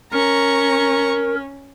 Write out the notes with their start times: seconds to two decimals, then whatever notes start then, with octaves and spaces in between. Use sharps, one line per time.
0.13 C#4 A#4 A#5 C#6